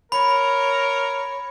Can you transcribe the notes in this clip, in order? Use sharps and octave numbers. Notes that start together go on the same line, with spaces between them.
A#4 C#5 B5